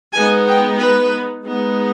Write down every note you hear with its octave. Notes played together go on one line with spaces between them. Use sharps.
G#3 B3 D#4 G#5
G5
B4
G#3 B3 D#4